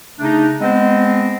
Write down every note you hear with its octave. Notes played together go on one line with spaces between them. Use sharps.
C#3 A3 D4 D#4
G#3 B3 C4 C5 D#5